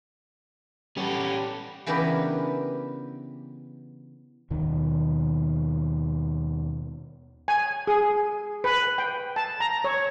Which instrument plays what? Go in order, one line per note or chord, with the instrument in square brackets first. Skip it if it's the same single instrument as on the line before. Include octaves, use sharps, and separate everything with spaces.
[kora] G3 B3 [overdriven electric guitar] C#4 A4 [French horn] G4
[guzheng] C#3 E3 B3 D4 G4 A#4
[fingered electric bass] D#2 B2 D#3
[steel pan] G#5
G#4
B4
G5
A5
A#5
C#5